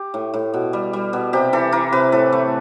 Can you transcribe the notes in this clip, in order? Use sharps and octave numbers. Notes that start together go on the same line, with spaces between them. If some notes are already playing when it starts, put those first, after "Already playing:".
Already playing: G4
A2
A2
B2
G3
G3
B2
C3 G4
E3 A4
E3 A#4
C3 B4
A2 A4
A3